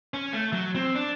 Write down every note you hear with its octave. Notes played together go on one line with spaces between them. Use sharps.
C#4
A3
F#3
C4
D4